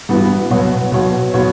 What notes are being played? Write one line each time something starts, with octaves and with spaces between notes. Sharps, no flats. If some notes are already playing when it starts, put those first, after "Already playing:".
G2 E3 B3 F#4
B2 F#3 B3 F#4 C#5
B2 F#3 B3 F#4 C#5
B2 F#3 B3 F#4 C#5